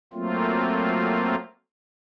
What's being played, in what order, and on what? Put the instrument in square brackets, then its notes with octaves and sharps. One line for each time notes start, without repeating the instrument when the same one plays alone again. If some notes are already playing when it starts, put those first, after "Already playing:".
[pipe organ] F#3 A3 A#3 C4 F4